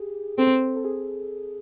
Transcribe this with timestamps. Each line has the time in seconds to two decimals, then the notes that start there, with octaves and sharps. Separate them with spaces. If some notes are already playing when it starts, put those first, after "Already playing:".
Already playing: G4 G#4
0.38 C4 A4
0.76 A4
0.84 G#4